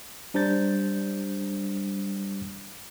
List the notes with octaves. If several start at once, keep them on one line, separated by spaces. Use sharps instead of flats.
G3 D4 C5 A#5 G6 A6